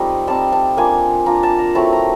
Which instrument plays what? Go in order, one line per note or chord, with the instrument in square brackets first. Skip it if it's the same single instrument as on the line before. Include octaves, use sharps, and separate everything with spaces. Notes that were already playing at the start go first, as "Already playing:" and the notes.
Already playing: [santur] G3 A3 C4 D#4 F4
G3 C4 D#4 A5
A5
A#3 D4 F4 G#5
A#3 D4 F4 A#5
A5
A#5
F#3 A3 C4 E4 A5
A#5